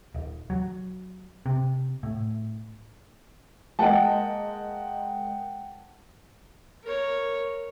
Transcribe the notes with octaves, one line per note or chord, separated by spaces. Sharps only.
D#1
F#3
C3
A2
G#3 A#3 D#5 F#5 G5 A5
A#4 C#5